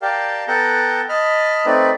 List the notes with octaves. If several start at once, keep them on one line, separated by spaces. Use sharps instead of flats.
G4 A#4 D5 F5 G5 A5
B3 A4 F#5 G5 A5 A#5
D#5 A5 B5 F6
A3 C4 D#4 B4 D5